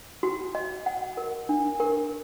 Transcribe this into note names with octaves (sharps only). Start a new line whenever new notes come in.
F#4
D#5
F#5
A#4
D4
A#4